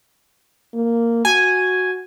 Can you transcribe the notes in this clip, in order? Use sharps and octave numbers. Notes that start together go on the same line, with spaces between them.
A#3
F#4 G#5